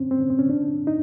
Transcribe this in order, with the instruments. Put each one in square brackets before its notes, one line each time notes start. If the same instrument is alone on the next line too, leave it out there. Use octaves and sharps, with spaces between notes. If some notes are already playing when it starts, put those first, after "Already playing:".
Already playing: [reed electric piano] C4 C#4
C4
C#4
C4
C#4
D4
D#4